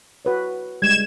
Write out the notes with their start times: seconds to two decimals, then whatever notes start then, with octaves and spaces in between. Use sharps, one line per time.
0.25 F#4 B4 C#5
0.82 G3 G#3 G#6 E7